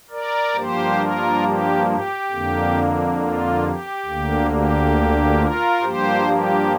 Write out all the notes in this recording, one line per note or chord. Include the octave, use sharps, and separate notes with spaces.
A#4 D5
G2 F3 A#3 G4 C5
F4 A#4
G4
G4
F2 D3 A#3
F4
G4
D2 D3 A#3
G4
F4 A#4
G2 F3 A#3 G4 C5
G4